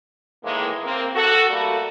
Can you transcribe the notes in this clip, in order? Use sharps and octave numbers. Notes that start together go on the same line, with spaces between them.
A2 D#3 E3 G#3 A#3
A#3 C4
F#4 A4
G3 A3 A#3 F#4 A4